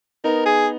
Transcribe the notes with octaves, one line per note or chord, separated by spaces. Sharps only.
B3 D#4 A#4
G#4